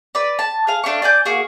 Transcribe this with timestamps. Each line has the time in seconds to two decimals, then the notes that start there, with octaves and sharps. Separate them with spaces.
0.15 B4 D5
0.39 A5
0.67 G#4 F5
0.84 A3 D4 F5 C#6
1.02 D5 G#5 D6 G6
1.26 A#3 F#4 G#4